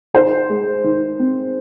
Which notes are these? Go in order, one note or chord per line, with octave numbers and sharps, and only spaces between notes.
D#3 C5
G#3
D#3
C4